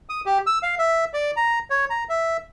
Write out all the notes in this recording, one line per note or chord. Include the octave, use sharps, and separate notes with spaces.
D#6
G4
E6
F5
E5
D5
A#5
C#5
A#5
E5